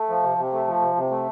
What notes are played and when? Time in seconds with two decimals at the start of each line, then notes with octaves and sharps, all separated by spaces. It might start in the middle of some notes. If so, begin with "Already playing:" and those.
Already playing: A3
0.09 F3
0.23 C3
0.38 C3
0.53 A3
0.67 F3
0.81 C3
0.96 C3
1.10 A3